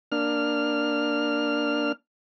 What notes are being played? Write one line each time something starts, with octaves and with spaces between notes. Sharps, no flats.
A#3 D4 F6